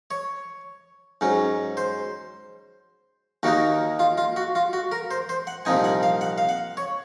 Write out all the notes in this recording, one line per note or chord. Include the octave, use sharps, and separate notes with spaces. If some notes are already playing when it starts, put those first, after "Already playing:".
C#5
G#2 F#3 C#4
C5
D#2 D#3 A#3 D#4 F#4
F4
F4
F#4
F4
F#4
A#4
C5
C5
F#5
C2 A#2 F3 C4 D#4 G#5
F#5
F5
F#5
F5
F#5
C#5